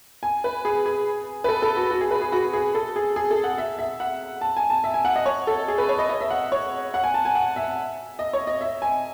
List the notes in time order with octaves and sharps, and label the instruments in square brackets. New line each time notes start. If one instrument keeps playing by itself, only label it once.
[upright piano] G#5
B4
G#4
G#4
B4
A4
A4
F#4
F#4
G#4
B4
G#4
F#4
G#4
A4
G#4
G#4
A4
F#5
E5
E5
F#5
A5
G#5
A5
E5
G#5
F#5
D#5
C#5
A4
G#4
B4
C#5
D#5
D#5
E5
F#5
C#5
F#5
G#5
A5
G#5
F#5
E5
D#5
C#5
D#5
E5
G#5